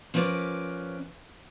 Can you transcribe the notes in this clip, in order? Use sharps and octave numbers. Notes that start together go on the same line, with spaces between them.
F3 C#4 A#4 B4 D5